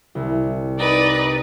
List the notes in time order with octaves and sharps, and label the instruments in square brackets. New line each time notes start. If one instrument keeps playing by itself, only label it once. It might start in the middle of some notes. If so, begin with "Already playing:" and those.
[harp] C2
[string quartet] D#4 B4 D5